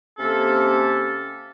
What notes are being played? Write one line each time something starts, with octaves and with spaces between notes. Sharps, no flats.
C3 A#3 C#4 A4